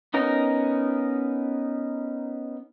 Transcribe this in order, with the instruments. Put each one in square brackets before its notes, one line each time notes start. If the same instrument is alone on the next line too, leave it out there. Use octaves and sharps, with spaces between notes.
[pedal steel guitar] B3 C#4 D#4 A#4